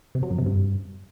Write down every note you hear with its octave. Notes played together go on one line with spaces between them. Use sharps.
C3
F#3
F#2
C3
G2